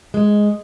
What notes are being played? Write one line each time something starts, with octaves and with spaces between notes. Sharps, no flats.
G#3